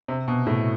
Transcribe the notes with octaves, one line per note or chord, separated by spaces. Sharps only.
C3
B2
A2